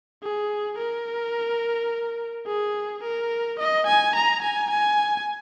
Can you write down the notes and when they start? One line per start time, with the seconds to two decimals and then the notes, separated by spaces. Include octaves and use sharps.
0.23 G#4
0.78 A#4
2.47 G#4
3.03 A#4
3.59 D#5
3.87 G#5
4.15 A#5
4.42 G#5
4.70 G#5